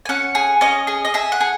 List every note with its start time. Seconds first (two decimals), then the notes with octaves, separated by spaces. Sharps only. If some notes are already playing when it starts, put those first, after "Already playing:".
0.05 G#5
0.09 C#4 F#5
0.35 G#4
0.61 C#4 D#5
0.87 G#4
1.05 D#5
1.14 G#4 E5
1.32 F#5
1.41 G#4